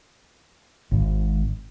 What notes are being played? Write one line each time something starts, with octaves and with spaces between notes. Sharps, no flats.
G#1 G#2